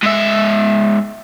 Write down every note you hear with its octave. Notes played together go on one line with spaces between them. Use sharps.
G#2 E5